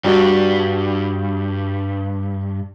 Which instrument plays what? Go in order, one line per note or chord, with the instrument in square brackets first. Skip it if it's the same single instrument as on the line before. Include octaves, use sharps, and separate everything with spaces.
[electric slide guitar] G2 [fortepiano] G3 F#4 D5